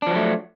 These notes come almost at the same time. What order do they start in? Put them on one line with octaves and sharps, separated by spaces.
D4 F3 F#3 A3